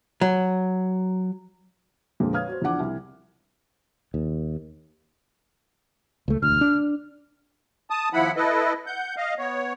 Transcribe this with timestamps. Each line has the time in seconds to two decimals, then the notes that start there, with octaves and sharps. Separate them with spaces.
0.21 F#3
2.20 F2 A#2 D3 G#3 A#3
2.33 B4 C#5 F5 D#6 F6 G#6
2.48 F#4 C5
2.62 E2 F3 D4 F#5 D6
2.80 C2
4.14 D#2
6.28 C#2 A3
6.42 E1 D2 F6
6.61 D4
7.90 A5 D#6
8.13 D#2 F3 E4 F#5 B5
8.36 E4 A4 B4 D#5
8.87 F#5 G6
9.17 D#5 F5
9.39 B3 C#5